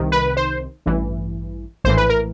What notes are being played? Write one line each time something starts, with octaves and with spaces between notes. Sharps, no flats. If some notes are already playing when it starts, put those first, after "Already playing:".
Already playing: C2 C3 D#3
B4
C5
A1 G2 E3
A#1 A2 E3 C5
B4
A#4